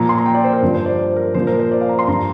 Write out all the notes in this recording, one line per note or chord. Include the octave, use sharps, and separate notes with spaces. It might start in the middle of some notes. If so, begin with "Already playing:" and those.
Already playing: A#2 F3 A#5
C6
A#5
G5
D5
C5
A#4
G2 F3
C5
D5
C5
A#4
A#2 F3 C5
A#4
C5
D5
F5
A#5
C6
G2 F3 A#5